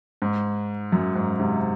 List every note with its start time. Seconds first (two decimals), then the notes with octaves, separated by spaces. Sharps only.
0.22 G#2
0.92 F#2
1.15 G#2
1.39 G#2 C3